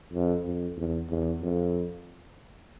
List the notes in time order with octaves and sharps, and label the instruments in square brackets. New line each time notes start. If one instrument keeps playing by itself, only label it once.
[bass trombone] F2
F2
E2
E2
F2